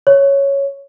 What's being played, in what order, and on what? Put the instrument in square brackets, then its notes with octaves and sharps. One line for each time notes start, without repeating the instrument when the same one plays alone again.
[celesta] C#5